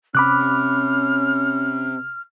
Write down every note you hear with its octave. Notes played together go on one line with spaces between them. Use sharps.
C3 C4 C#4 B5 D6 F6 F#6